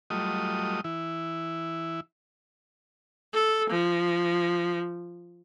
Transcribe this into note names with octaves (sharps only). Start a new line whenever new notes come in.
F#3 G3 A3 F4 D#5 D#6
E3 E4
A4
F3